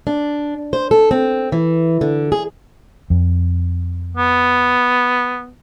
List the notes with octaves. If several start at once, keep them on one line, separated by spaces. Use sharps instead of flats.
D4
C5
A4
C4
E3
D3
G#4
F2
B3